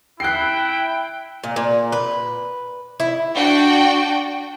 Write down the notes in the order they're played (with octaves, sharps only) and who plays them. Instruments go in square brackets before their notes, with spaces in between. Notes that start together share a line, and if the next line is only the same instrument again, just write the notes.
[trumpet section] E4 [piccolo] G5 [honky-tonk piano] F#6 C7
[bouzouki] A#2
A#2
B4
E4
[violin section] D4 F#4 G5